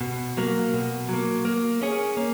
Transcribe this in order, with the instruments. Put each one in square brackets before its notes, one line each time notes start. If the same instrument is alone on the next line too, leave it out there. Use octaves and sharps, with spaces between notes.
[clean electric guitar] B2
F#3 A#3
B2
F#3 A#3
A#3
C#4 G#4 C#5
A#3